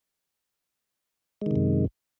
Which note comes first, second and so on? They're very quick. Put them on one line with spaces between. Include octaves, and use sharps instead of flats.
G#3 D#3 C3 F#2